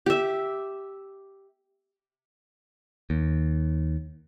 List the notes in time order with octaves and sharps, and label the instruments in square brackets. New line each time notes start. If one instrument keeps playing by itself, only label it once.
[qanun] G4 E5
[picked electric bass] D#2